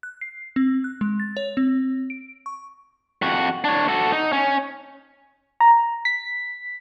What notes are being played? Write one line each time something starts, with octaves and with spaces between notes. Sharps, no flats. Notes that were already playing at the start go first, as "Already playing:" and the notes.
F#6
C7
C4
F#6
G#3
A6
C#5
C4
D7
C#6
F2 F#4
D4 C#5
F#4 A4
D#4
C#4
A#5
B6